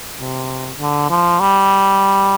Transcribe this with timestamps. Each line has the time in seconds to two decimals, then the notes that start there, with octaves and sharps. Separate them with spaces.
0.18 C3
0.78 D3
1.10 F3
1.40 G3